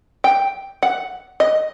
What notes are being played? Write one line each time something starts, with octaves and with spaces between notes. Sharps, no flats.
G5
F#5
D#5